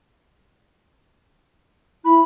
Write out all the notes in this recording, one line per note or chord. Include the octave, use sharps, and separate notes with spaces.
E4 B5